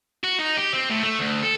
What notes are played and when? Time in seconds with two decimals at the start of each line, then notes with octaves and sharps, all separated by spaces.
0.24 F#4
0.39 D#4
0.57 G4
0.73 C4
0.90 A2
1.03 A3
1.19 D2
1.43 A4